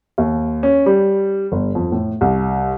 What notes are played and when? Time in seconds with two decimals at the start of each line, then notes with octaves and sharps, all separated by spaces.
0.18 D#2
0.63 C#4
0.86 G3
1.52 G1
1.75 F2
1.92 A2
2.21 C2